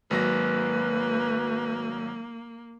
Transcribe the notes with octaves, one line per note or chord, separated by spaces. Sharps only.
G#1 F#3 A#3 B4 A#6